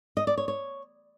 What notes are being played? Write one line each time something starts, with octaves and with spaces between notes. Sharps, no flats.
D#5
D5
C#5
C#5